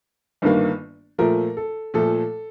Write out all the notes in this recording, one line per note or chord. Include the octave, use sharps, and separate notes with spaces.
G1 G2 D#3 A#3
A#2 F3 A3 A#4
A4
A#2 F3 A3 A4